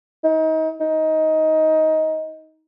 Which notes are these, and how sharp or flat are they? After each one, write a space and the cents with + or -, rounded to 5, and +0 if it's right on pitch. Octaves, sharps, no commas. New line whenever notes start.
D#4 +30
D#4 +15